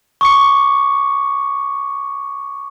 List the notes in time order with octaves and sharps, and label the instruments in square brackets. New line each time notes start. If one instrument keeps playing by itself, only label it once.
[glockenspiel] C#6 D6 C#7